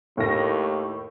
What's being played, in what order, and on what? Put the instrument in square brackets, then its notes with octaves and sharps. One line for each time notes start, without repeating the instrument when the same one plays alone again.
[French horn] D#2 [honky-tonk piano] A2 A#6